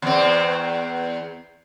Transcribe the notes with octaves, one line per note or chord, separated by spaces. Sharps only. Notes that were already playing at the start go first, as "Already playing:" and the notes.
E2 C4